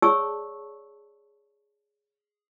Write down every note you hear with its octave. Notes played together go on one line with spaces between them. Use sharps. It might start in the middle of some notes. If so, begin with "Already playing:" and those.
G#4 C#5 D5 A5 C#6 E6